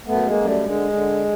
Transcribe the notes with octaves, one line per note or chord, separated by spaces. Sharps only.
F#2 A3 B3
G#3 A#3
F#2
G3 A3
D3 G#3
D3